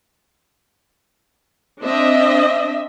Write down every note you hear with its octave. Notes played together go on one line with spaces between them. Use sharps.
C4 D4 D#5 E5